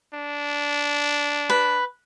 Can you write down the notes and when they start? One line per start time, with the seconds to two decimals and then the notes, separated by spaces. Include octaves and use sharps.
0.14 D4
1.50 B4